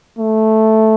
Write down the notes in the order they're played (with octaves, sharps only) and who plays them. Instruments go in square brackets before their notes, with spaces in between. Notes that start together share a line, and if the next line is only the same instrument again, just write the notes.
[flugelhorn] A3